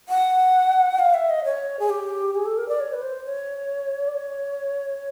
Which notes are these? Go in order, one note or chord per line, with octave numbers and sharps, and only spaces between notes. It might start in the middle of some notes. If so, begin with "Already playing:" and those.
F#5
F5
E5
D#5
C#5
G#4
G4
G#4
A4
A#4
D5
C#5
B4
C5
C#5
D5
C#5